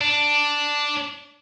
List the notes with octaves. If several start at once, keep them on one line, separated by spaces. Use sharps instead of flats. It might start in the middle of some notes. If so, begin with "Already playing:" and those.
D4